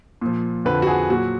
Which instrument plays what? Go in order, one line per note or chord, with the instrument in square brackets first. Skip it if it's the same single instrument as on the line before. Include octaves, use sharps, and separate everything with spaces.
[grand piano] A#2 F3
F2 D3 F3 B4
F#4
G#4
A#2 F#3 F#4